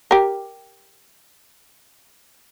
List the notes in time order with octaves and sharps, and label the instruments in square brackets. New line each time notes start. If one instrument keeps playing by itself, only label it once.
[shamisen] G4 A#4